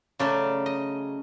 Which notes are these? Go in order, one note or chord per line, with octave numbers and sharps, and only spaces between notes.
C#3 F#3 A3 C#4 D5
D#5